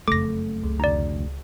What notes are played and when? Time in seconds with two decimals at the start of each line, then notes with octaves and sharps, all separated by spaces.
0.08 F#1 F2 C#3 A3 D6 A#6
0.64 C#2
0.80 F1 D2 D5 A#5